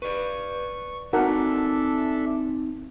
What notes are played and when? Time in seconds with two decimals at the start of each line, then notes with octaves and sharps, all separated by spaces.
0.02 B4 D5 C#6
1.13 C4 D4 D#4 F#4 A4 A#4 E5 F#5